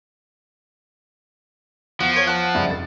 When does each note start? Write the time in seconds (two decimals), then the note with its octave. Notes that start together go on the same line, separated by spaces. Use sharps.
2.00 E2 F3 F#4
2.13 F4 C#5
2.27 F#5 A5
2.54 C#2 G2 E4
2.70 F1 A6